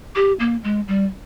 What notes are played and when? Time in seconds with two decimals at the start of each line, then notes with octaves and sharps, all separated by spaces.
0.15 G4
0.40 A#3
0.64 G#3
0.88 G3